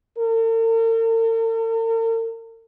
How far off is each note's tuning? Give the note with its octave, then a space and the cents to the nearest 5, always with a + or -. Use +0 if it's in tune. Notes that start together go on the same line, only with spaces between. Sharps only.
A#4 -45